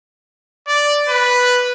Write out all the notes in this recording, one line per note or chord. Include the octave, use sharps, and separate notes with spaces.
D5
B4